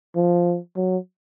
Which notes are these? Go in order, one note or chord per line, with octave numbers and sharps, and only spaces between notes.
F3
F#3